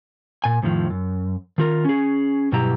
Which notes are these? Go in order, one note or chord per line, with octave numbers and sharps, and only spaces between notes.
A#2 G#5
F2 A2 D#3 F3
F#2
D#3 F4 A#4
C#4 G#4
G2 B2 F#3 E4 G4 A#5